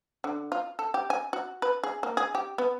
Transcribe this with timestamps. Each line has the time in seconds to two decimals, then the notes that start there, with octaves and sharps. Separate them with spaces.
0.24 D3
0.52 F4
0.79 A4
0.94 G4
1.10 G#5
1.33 F#4
1.62 B4
1.84 G#4
2.03 A#3
2.17 G#4
2.35 G4
2.58 B3